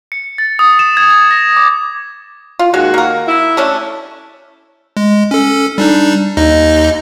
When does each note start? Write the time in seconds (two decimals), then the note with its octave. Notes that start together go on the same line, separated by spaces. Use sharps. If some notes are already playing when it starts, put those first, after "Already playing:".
0.12 C#7
0.38 A6
0.59 D#6
0.79 E7
0.97 G#6
1.10 G#6
1.31 A#6
1.57 D6
2.59 F4
2.74 D#2 D#3 G#3 F#4
2.94 A#3 A#4
3.27 E4
3.57 A3 C#4 D4
4.97 G#3
5.31 C#4 A4
5.78 G3 D4 D#4
6.37 D#2 D#4 D#5